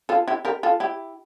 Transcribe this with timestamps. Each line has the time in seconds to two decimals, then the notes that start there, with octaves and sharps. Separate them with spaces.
0.09 F4 A4
0.28 E4 G4
0.45 G4 A#4
0.63 F4 A4
0.80 E4 G4